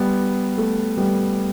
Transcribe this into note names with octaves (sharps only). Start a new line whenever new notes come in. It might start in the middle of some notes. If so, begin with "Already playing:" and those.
Already playing: G3 B3
A3
G3 B3